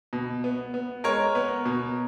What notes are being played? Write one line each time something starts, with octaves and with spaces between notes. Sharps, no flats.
B2
B3
B3
G#3 A#4 C#5
B3
B2